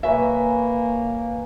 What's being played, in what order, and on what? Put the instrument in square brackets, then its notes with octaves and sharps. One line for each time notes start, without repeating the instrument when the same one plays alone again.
[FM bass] B1 [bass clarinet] A#3 [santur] B4 C#5 G#5 [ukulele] E5